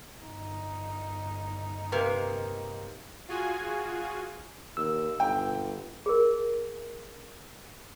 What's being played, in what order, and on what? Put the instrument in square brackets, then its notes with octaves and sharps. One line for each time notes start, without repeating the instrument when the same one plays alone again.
[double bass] G1 D#4
[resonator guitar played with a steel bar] C3 A#3 [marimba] B4
[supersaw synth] F4 F#4 G#4 G#5
[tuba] D#2 [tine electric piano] E6
[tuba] G1 [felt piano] G5
[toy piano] G#4 A#4